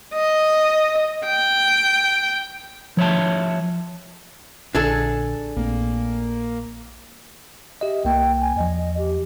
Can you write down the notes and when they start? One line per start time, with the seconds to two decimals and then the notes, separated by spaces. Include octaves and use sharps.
0.14 D#5
1.26 G5
2.97 F3 C#5 E5 A5
4.75 A#1 D3 D4 G#4 A4
5.56 A#1 A3 A#3 C4
7.81 G4 D#5 E5
8.05 C2 A#3 G5
8.41 G#5
8.56 E2 F3 D#5
8.97 G4